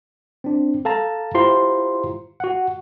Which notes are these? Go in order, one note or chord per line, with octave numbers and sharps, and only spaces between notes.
C4 D4
A4 F5 A5 A#5
E4 F4 G4 C5 A#5 C6
F#4 F#5